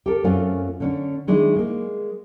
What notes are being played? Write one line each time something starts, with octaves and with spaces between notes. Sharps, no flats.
G4 A4 A#4
F#2 A3 C4 C#4 F4 G#5
D3 C#4 D4
D#3 G#3 D4 E4 G#4
G#3 A#3